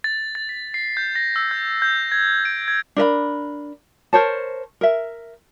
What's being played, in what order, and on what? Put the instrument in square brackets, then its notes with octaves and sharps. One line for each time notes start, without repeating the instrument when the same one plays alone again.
[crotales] A6
A6
B6
C7
G6
A#6
E6
G6
G6
G#6
D7
G#6
[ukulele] D4 A#4 E5 B5
A#4 C5 C#5 A5
A#4 E5